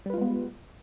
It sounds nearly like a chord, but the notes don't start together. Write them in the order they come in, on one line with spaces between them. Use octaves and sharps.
G3 B4 F4 G#3 B3